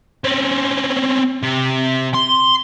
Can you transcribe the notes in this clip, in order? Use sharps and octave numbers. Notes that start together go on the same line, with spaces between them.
C4 C#4
C3
C6